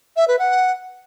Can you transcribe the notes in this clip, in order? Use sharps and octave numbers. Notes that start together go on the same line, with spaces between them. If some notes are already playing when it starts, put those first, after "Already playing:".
E5
B4
F#5